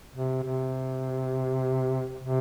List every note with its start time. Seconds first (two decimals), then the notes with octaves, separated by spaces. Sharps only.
0.13 C3
0.43 C3
2.23 C3